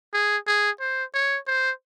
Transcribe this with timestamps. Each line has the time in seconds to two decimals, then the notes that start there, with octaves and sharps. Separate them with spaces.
0.14 G#4
0.47 G#4
0.81 C5
1.14 C#5
1.47 C5